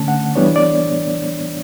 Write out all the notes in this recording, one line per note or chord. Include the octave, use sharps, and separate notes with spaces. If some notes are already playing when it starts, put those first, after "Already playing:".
Already playing: D3 A3 C#4 A5
F#5
E3 G3 B3 D4 C#5
D5